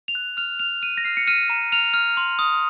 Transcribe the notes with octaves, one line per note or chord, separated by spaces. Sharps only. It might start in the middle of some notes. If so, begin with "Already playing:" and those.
F7
F#6
F6 F7
F6 F7
F6 D#7
A#6
F6 C7
C#7
F6 D#7
A#5
F6 F7
F6
C6
D#6